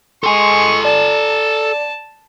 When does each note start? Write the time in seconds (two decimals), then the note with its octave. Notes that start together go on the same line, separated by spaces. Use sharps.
0.23 G#3 A4 G#5 C6 C#6
0.85 D5 A5